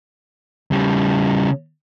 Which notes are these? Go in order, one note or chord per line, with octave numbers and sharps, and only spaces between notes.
C#3 G3